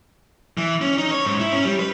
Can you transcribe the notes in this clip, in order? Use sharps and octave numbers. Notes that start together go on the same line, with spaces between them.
E3
C#4
D#4
C#5
G#2
E4
C#4
G3
B4